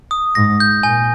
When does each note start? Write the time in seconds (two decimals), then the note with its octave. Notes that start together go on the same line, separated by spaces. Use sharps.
0.11 D#6
0.35 G#2 A#6
0.60 G6
0.83 A#2 G#5